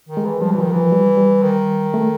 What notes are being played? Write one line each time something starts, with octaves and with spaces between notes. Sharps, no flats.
D#3
G#3
E3
F3 G3
E3 F#3
D#3 F3
E3 F3
G3
G3
D#3
A3